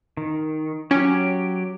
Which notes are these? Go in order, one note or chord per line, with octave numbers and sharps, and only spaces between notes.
D#3
F#3 C#4 G4